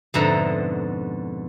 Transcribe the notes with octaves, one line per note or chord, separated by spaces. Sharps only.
F2 G#2 B2 D3 E5 A#5